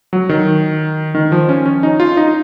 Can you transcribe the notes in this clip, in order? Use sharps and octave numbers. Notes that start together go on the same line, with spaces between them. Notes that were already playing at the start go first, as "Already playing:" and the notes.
F#3
D#3
D#3
F3
C#4
C#4
D#4
F4
D#4